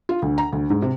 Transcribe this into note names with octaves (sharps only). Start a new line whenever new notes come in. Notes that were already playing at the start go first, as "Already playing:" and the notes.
F4
D2
A#5
D2
G#2
C3